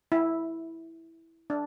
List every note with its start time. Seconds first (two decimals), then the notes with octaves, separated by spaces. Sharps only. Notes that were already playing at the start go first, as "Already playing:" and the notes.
0.12 E4
1.50 D4